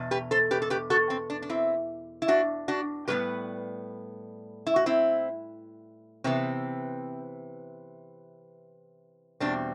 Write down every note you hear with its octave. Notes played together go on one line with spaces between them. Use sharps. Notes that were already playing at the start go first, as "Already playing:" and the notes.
Already playing: E2 B2
G4 B4
A4 C5
G4 B4
A4
G4 B4
F#4 A4
C4
D4
D4
C4 E4
E4
D4 F#4
D4 F#4
A2 G3 B3 G4 B4
E4
F#4
C4 E4
C3 E3 B3 C4
E2 B2 G3 C4 D4